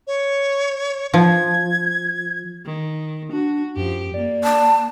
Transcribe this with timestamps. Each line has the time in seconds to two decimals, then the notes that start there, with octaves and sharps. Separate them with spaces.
0.07 C#5
1.14 F3 G#6
2.66 D#3
3.32 D4 F#4
3.76 F#2 F3 G4
4.14 A#3 D5
4.44 A5